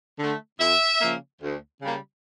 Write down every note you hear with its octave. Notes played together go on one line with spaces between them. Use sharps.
D3 A3
F2 E5
C#3 F3 A#3
D2
C#3 G3 A#3